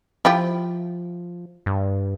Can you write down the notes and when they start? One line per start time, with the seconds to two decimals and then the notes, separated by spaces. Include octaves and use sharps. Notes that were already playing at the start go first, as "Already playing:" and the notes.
0.25 F3 E4 F4 G4
1.66 G2